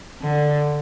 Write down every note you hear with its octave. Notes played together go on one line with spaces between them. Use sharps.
D3